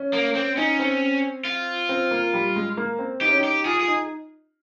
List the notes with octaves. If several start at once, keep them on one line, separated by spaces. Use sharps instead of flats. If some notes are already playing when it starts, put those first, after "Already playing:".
Already playing: C#4
A#3
C4
C#4 D#4
C4
F4
C4
A#3
G3
G#3
A#3
C4
D#4 G4
C#4
D#4
G4
F4 G#4
G#4
D#4